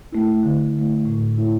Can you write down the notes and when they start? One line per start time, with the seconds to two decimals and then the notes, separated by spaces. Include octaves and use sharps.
0.12 A3 E4
0.43 D3
0.74 A3 E4
1.06 A2
1.37 A3 E4